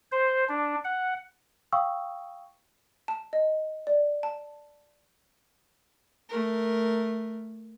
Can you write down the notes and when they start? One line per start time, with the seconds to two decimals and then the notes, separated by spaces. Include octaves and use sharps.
0.12 C5
0.49 D4
0.84 F#5
1.72 F5 G5 C#6 D#6 E6
3.08 A5
3.33 D#5
3.87 D5
4.23 A5
6.29 A3 A#4